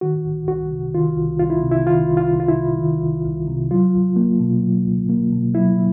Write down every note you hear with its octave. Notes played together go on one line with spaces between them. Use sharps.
D#3 F#4
C2
C2 F#4
C3
D#3 F4
C2
C2 F4
E4
C3
E4
D#3 F4
C2
F4
C2
F4
E4
C3
D#3
C2
C2
C3
F#3 F4
C#2
A#3
B2
F#3
C#2
A#3
B2
F#3 E4